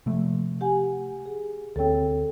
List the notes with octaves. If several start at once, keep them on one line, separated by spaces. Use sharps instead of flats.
C3 F3 A3
G4 F#5 G#5
G#4
D2 C4 A4 C#5 G5